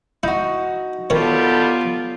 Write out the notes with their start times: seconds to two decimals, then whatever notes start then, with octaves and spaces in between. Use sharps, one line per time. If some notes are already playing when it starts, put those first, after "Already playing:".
0.23 D#4 E4 F#4
1.10 D#3 F#3 G3 B3 F4 A4 C#5